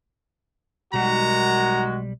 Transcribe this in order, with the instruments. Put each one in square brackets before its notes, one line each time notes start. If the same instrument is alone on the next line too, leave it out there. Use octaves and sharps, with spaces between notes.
[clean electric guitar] B1 G3 [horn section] D#3 F#4 [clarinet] G#3 [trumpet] A#5